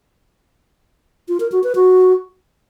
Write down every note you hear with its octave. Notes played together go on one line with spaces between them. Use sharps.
F4
A#4
F#4
B4
F#4